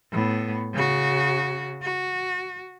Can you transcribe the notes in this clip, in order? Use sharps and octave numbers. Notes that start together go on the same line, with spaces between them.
A2 B3
C#3 F#4
F#4